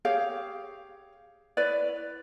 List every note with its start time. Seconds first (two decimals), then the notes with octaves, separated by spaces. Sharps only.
0.05 G4 G#4 C#5 F5
1.57 E4 B4 C#5 D5